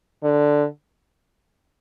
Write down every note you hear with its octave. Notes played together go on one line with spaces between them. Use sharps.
D3